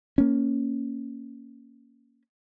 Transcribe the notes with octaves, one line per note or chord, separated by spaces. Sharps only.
A#3 C#4